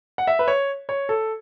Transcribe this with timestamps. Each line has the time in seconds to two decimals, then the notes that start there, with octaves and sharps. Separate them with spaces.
0.18 F#5
0.27 E5
0.39 B4
0.48 C#5
0.89 C#5
1.09 A4